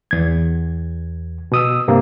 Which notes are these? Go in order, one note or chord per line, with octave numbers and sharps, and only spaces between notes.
E2 G#6
B2 D#6 E6
G2 C3 A#3